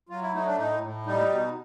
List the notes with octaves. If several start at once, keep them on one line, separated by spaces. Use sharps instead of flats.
F#3 F4
E4
A3 D#4
D4
A2 D#4
A2
G3 D#4
B2